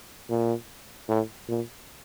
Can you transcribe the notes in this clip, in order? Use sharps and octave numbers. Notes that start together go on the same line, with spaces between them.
A#2
A2
A#2